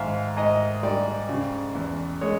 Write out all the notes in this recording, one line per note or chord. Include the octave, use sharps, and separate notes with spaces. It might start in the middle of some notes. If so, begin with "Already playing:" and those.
Already playing: G#2 D#3 E5 F5
G#2 D#5
G3 D5
C#3
E2
G#3 C#5